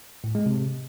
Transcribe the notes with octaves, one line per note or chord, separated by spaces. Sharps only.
A2
G#3
C3